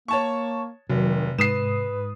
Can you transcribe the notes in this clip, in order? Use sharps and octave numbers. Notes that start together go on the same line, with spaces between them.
A#3 C#5 A5 C#6
F1 C3 D#3 F#3
G#2 B4 D#6 C7 E7